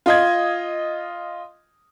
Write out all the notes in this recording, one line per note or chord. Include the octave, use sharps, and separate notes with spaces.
F4 D#5 G#6